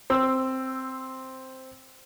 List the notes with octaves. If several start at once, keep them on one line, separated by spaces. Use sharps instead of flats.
C4 E6